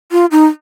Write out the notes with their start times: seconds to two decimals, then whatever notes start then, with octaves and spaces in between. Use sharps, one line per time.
0.12 F4
0.31 D#4